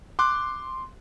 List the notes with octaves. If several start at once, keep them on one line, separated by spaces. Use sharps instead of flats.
C6 D6 F#6